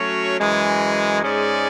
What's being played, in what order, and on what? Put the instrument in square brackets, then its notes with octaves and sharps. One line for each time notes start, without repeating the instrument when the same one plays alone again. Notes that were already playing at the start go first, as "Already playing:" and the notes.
Already playing: [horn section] F#3 A3 C#4 F#4 C#5
F#2 E3 G#3
G#2 G#3 C#4 G#4 D5